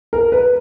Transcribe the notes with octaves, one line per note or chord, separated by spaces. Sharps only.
A#4
B4